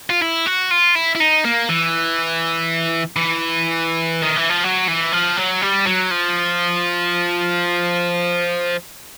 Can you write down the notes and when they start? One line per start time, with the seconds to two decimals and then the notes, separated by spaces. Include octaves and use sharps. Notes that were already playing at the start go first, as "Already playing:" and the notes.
0.10 F4
0.22 E4
0.46 F#4
0.71 F4
0.95 E4
1.15 E4
1.20 D#4
1.45 A#3
1.69 E3
3.16 E3
4.22 D#3
4.36 E3
4.50 F3
4.64 F#3
4.88 E3
5.13 F3
5.37 F#3
5.62 G3
5.86 F#3
6.11 F3